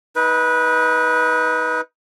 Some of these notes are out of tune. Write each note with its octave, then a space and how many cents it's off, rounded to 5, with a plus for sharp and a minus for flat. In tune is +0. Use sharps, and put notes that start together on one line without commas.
D#4 +25 B4 -15